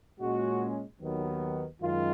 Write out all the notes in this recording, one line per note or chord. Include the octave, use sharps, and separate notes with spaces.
A#2 G#3 C#4 F#4
D#2 D#3 F#3 B3
F#2 D#3 G#3 F4